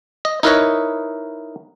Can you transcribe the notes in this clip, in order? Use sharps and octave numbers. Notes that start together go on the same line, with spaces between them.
D#5
D#4 E4 A#4 B4 C#5 D#5